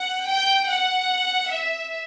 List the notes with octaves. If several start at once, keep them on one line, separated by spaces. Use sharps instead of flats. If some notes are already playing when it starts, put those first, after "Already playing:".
Already playing: F#5
G5
F#5
E5